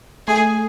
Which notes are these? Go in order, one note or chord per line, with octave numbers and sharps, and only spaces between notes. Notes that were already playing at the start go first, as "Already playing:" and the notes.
A3 G#4